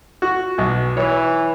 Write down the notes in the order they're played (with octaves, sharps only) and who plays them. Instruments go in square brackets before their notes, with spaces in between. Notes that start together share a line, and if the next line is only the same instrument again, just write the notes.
[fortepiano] F#4
B1 F#4
[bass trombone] E3 [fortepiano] C#5